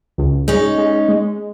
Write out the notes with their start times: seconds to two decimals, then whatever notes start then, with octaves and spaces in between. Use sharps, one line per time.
0.18 C#2
0.48 G#3 C#4 D#4
0.78 G#3
1.09 G#3